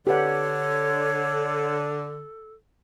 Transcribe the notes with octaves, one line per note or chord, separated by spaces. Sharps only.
D3 G4 A4 B4 C#5 F#5